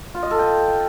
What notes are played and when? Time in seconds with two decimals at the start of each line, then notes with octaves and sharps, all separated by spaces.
0.14 F4
0.23 D#5
0.31 A4
0.39 G5